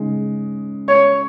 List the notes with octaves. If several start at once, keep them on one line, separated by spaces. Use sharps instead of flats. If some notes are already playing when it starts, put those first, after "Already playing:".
Already playing: C#3 G#3 D#4
C#5